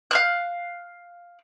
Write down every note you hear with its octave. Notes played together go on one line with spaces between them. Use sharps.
F5 F6 F#6